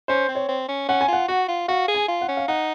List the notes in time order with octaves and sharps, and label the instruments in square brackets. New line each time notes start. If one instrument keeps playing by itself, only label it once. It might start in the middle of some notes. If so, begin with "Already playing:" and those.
[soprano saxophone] C#4 [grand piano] C5
[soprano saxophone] C4
[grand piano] C#5
[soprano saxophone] C4
C#4
[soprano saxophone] C#4 [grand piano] F#5
[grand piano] G#5
[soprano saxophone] F4 [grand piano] F#5
[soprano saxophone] F#4 [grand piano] F#5
[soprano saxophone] F4
[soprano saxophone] F#4 [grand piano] F5
[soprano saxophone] G#4
[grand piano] G#5
[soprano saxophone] F4
[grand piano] F#5
[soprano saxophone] C#4
[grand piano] F5
[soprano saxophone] D#4 [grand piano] F#5